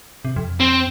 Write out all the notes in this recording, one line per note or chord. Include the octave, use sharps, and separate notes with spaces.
C3
F2
C4